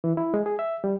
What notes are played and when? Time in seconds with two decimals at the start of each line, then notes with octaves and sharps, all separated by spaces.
0.04 E3
0.17 E4
0.34 G#3
0.46 G#4
0.59 E5
0.84 G3